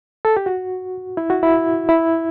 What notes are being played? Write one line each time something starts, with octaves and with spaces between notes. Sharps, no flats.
A4
G4
F#4
E4
F#4
E4
E4